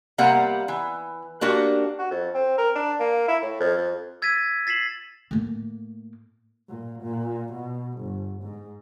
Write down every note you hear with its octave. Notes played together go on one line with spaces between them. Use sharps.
C3 G3 A#3 F5 F#5 A#5
E3
A#3 D4 F#4 G4
F#4
F2
C4
A#4
D4
A#3
E4
A2
F2
F2
E6 G#6 A6 B6 D#7
A6 B6 C7 E7 F#7
A2 A#3
A#2
A#2
B2
G1
G#2